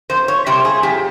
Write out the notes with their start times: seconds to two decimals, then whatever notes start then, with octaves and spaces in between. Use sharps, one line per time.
0.10 F2 C5
0.28 C#5
0.46 C3 G3 A#3 C5
0.65 G#4
0.83 F2 G4